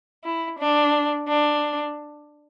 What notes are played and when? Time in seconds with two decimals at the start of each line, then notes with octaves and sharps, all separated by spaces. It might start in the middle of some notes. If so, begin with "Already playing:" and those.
0.24 E4
0.59 D4
1.28 D4